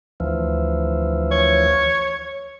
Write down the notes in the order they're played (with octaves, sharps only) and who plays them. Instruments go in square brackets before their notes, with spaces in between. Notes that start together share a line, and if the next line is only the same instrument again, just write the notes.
[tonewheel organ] D2 E3 F3
[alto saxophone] C#5